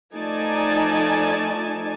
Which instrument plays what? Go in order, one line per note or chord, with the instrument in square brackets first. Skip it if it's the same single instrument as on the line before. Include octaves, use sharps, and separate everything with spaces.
[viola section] F3 A3 D#4 D5 G#5 A5